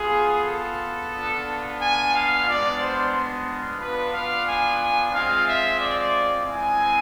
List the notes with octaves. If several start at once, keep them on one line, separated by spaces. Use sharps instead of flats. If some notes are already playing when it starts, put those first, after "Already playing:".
Already playing: B3 F4 G#4
A4
B3 D4 F4
G#5
F5
G#3 B3 D4 F4 D5
C5
B3 D4 F4 B4
F5
G#5
G#5
G#3 C4 F4 F5
E5
D5
G#3 C4 E4 G#5